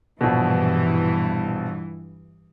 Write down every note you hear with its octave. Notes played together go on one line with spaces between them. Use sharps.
A#1 G2 B2 E3